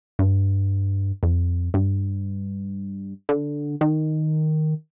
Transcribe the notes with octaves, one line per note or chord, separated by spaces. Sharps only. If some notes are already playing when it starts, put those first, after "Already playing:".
G2
F2
G2
D3
D#3